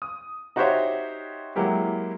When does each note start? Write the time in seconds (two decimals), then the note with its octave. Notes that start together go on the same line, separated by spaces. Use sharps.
0.02 D#6
0.56 D#4 F#4 G4 C5 C#5 E5
1.56 F#3 G#3 A#3 E4 G4